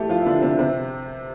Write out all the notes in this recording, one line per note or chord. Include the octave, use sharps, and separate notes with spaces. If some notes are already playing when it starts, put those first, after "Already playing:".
Already playing: E3 A3 E4 G4 A4
F3 F4
E4
D3 D4
C3 C4
C3 C4